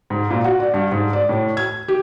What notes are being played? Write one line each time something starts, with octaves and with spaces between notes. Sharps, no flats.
G#2
A#2
F#4
D5
G2
G#2
D5
A2
G#6
G4